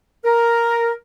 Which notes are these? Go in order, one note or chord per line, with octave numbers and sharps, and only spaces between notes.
A#4